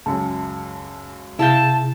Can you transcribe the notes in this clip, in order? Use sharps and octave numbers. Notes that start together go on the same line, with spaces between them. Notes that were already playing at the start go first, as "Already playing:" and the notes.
C#2 F#2 A5
C3 E4 G#4 F5 G5 A5